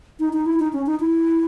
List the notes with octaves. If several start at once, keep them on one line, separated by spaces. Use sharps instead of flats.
D#4
D#4
E4
D#4
C#4
D#4
E4